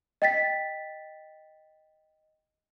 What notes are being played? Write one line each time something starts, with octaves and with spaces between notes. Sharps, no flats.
D#5 G5 A6 B6